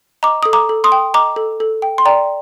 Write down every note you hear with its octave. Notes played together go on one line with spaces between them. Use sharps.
D#5 A#5 D6
A4 D#6
A#5 D6
A4
C6 D#6
G5
D#5 A#5 D6
A4
A4
G5
C6
D5 G5 A#5